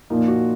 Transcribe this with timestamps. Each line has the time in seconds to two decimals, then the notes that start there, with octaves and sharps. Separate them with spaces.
0.10 A#2 F3 A#3 D#4
0.28 F#4